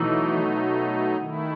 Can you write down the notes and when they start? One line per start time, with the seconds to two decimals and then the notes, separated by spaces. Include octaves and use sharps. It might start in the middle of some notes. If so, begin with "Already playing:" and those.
Already playing: B2 E3 F#3 A3 D#4
1.17 D#3 A3 E4